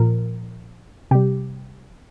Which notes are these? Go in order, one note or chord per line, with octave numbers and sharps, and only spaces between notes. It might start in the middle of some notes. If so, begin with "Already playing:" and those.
Already playing: A#2 F3 A#4
C3 G3 G4